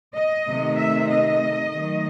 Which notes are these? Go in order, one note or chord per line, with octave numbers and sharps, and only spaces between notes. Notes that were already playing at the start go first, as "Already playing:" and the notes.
D#5
C3 D#3 A3
E5
D#5
D#3 F#3 A3